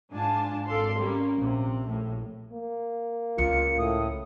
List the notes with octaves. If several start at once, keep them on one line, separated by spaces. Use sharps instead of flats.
G#2 D4 F4 G#5 A5
G#1 A4 D5 F5 C6
G3 A#3 C#4
A#1 C3
A#1 A2
A#3
C#2 F4 C#7
A2 D#6